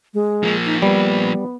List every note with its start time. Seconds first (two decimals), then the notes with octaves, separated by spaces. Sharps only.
0.14 G#3
0.43 F3 A#3
0.66 D#4
0.82 G3 B3